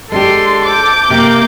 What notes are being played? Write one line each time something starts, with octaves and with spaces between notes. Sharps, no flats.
G#3 D4 G4 A4 C6
D6 G6
C3 A#3